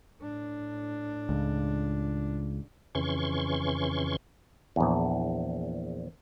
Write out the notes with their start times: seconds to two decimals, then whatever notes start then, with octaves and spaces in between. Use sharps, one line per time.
0.19 A2 D4
1.29 C#2
2.95 F2 C#3 E3 C#4 C6 C#6
4.76 A#1 E2